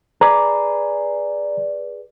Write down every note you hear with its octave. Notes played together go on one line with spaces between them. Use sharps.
G#4 B4 D5 A#5